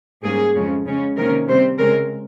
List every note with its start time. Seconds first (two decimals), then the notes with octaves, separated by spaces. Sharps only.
0.22 G#2 G3 A#3 C#4 G#4
0.54 F2 C#3 F3 G#3 C#4
0.85 C#3 G#3 C#4
1.16 C3 D#3 A#3 C#4 A#4
1.47 C3 G3 C4 C5
1.79 C#3 G#3 C4 A#4